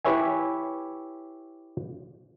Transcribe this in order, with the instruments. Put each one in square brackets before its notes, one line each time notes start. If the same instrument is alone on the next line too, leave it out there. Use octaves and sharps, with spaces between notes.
[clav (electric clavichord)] E4 G4 B4 C#5 E5 G#5